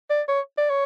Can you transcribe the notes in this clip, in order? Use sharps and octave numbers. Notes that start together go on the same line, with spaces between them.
D5
C#5
D5
C#5